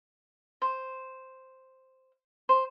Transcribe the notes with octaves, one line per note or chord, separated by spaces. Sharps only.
C5
C5